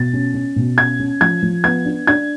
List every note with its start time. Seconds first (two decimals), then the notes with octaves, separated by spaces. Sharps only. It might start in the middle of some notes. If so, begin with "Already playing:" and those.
Already playing: B2 A6
0.13 C#4
0.34 C#4
0.56 B2
0.78 C#4 G#6
0.99 C#4
1.21 F3 G#6
1.42 F3
1.64 B3 G#6
1.85 D4
2.07 D4 G#6